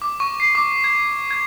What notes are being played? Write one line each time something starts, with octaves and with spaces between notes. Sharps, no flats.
D6
C#6
C7
D6
G#6
G#6